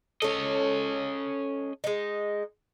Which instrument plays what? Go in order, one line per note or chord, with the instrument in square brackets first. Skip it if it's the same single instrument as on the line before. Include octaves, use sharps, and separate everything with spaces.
[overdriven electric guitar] C#4 D#5 [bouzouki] A4 C#5
[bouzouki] G#3 D#4